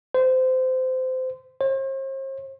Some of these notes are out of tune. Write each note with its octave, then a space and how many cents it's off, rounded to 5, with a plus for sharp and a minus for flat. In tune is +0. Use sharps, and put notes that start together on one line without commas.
C5 -20
C5 +45